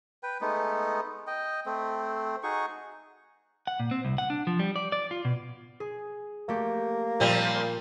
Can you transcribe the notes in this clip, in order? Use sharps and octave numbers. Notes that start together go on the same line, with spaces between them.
B4 G5
G#3 A3 B3 D#4
D#5 G5
A3 C4
D#4 F#4 G#4 C#6
F#5
A#2
C4
C2
F#5
D4
F3
G3
D5
D5
F4
B2
G#4
A3 A#3 G4
A#2 F3 G3 C4